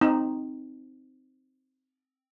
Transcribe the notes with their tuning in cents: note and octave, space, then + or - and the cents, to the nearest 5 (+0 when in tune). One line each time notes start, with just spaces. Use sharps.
C4 +0 D#4 +0